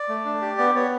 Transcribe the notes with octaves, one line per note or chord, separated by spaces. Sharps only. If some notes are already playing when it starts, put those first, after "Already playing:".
Already playing: D5
A3
D4
G4
B3 D5
B3 C#5